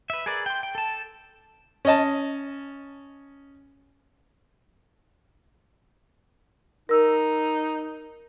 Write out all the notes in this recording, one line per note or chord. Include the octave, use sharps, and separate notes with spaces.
B4 E5
G#4 A#4 B4 D5
G5 C6
G5
A4 A5
C#4 D#5 A5
D#4 A#4 E6